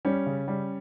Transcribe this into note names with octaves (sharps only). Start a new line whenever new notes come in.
G3 C#4
C#3
G3